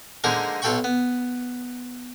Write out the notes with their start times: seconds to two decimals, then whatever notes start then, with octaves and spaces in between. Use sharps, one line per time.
0.24 D3 F3 G#3 A#3 D#4 A#4
0.62 B1 F4 A4 G5 B5 C#6
0.84 B3